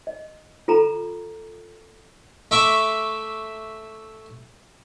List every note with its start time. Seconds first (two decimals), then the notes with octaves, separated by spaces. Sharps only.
0.07 D#5
0.68 F4 A4 A#5 B5
2.51 A3 E5 C#6 D6